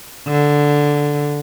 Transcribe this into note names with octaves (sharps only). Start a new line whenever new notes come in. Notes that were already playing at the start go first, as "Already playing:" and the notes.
D3